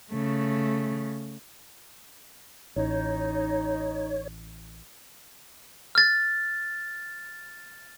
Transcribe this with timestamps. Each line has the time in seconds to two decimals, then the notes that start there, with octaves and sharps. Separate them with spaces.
0.11 C#3 A3
2.76 A1 D#4 C#5
5.95 F6 A6